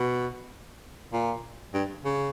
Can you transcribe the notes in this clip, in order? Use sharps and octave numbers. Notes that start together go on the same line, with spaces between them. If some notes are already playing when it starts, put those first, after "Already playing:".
Already playing: B2
A#2
G2
C#3